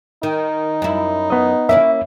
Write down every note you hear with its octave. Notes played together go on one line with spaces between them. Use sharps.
D#3 D#4
F#2 E4
B3 D#5
A#3 C#4 E4 E5